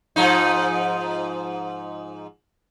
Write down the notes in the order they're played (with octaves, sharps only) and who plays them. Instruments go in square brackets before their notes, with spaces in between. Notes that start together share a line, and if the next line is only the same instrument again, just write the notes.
[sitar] G#2 F3 D#4